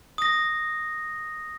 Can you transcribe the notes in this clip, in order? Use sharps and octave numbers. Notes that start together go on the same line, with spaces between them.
D#6 A#6